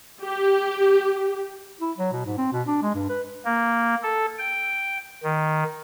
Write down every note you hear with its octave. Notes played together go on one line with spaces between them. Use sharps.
G4
E4
F#3
B2
G#2
C4
B2
D4
G#3
G2
B4
A#3
A4
G5
D#3